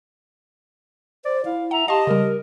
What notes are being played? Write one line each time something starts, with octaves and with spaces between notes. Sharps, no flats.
C5 D5
E4 F5
E5 F#5 A#5
G4 D#5 F5 A5 C6
C#3 G3 A#4